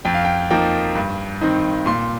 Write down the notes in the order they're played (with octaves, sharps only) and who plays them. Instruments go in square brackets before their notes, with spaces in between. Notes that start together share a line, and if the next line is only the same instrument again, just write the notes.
[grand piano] F2 G5
F5
G5
F3 A#3 D#4 G5
G2
D#3 C4 D#4
A#2 C6